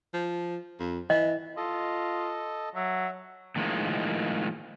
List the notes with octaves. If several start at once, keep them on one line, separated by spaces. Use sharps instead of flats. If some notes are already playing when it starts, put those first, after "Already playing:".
F3
F2
E3 D#5
F4 A4 D#5
F#3 E5
A2 D#3 F3 G#3 A#3